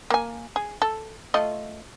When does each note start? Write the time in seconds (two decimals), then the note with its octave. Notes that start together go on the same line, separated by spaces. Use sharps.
0.10 A#3 G#5
0.56 G#4
0.82 A4
1.34 A3 F4 D#5